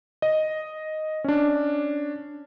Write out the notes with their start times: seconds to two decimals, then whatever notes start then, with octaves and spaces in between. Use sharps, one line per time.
0.22 D#5
1.24 C#4 D4